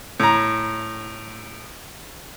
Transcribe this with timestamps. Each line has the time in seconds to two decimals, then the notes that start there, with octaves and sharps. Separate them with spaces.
0.20 A2 A#5